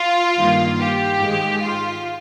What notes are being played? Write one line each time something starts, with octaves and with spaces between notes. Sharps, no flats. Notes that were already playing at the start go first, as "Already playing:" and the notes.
Already playing: F4
G2 D#3 A#3
G4
G#2 D#3 G#3
F4